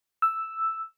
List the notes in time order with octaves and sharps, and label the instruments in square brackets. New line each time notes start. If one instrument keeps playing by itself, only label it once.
[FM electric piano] E6